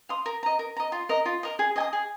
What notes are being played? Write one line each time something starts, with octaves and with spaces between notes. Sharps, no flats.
F5 C6 D#6
A#4
D#5 A#5
A#4
D#5 A#5
F4
A#4 D#5
F4
A#4 D#5
G#4
D#5 G#5 D#6
G#4